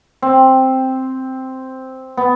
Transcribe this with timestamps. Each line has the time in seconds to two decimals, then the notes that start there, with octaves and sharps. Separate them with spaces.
0.22 C4
2.17 B3